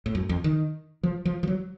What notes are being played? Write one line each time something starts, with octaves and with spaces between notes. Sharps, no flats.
A2
F#2
F2
D#3
F3
F3
F3
F#3